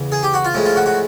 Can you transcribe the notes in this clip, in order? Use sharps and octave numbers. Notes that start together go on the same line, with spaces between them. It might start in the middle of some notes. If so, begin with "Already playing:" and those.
Already playing: E2 C#3
G#4
G4
F#4
F4
A2 F3 G#3
F4
F#4
F#4